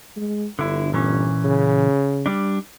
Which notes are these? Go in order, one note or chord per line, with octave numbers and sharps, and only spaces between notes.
G#3
G1 D3 E4
A#2 E3 C#4
C#3
G3 D4